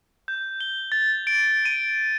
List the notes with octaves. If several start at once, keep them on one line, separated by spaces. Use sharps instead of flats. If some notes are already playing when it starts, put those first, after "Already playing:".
G6
G7
A6
D7
D#7